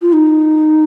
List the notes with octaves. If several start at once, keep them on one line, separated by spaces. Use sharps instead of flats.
F4
D#4